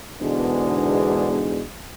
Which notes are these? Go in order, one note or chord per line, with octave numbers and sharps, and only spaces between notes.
E2 G#2 B2 D3 G#3 D4